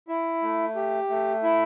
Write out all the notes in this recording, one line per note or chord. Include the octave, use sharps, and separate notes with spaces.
E4
A3
G4
A3
E4